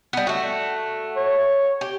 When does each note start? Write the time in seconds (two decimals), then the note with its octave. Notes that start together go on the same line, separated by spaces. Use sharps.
0.13 G3 B3
0.27 A3 F#4
1.16 C#5
1.81 G4